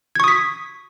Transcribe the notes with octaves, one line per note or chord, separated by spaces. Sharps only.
C#6 D#6 G#6 B6